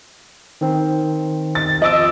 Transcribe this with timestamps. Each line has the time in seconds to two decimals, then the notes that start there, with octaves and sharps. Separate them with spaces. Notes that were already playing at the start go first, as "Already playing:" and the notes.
0.61 D#3 C4
1.55 A6
1.82 F3 D#5 D6 E6